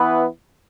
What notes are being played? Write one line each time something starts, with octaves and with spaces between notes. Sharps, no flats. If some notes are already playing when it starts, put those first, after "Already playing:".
Already playing: E3 B3 E4 B4